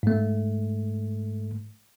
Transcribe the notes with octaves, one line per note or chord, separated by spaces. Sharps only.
G#2 A3